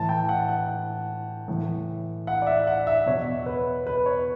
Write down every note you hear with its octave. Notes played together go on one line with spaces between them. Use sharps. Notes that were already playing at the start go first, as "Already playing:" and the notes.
Already playing: A2 E3 A5
G5
F#5
F#5
A2 E3
F#5
D5
E5
F#5
E5
E2 B2 C#5
B4
B4
C#5